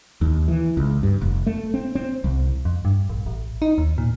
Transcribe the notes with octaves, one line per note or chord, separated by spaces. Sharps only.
D#2
E3
C#2
G2
F1
A3
C4
C4
C2
F2
G2
A#1
A1
D#4
D#2
A#2